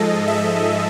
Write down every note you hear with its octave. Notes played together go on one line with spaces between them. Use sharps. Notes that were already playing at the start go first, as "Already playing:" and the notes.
Already playing: G#2 F3 G#3 A4 D#5
E5